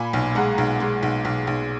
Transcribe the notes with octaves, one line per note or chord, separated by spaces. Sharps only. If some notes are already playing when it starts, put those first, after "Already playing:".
Already playing: A#2 G#5 B5
B1
G#3 F#5 A#5
B1
G#3
B1
B1
B1